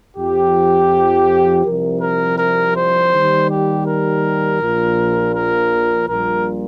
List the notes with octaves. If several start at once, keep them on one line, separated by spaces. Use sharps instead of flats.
F2 F3 G4
C2 C3 F3 A#4
A#4
A#4
C5
D#2 D#3 G3
G4
A#4
A#1 A#2 F3
A#4
A#1 A#2 G3 A#4